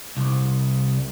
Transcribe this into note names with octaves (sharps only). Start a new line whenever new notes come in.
C2